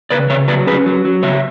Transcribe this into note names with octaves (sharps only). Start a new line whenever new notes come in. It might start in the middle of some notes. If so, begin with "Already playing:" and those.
C#3 B4 D5
C#3 C#5 E5
F#3 B4 D5
C#4 G#4 B4
F#3
F#3
C#3 C#5 E5